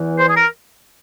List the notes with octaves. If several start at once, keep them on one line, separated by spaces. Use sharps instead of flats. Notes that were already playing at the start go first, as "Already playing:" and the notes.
Already playing: E2 E3
C5
G#4
A#4